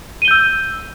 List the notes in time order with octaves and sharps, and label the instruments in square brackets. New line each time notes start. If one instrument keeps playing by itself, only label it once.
[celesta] D#7
G7
G6
E6